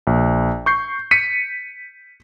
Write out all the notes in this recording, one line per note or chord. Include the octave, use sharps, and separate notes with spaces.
A#1
C#6 G6 C7
B6 C#7 D#7